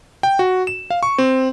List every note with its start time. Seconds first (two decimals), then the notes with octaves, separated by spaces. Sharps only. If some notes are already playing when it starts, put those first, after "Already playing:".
0.23 G5
0.39 F#4
0.67 E7
0.90 F5
1.03 C#6
1.18 C4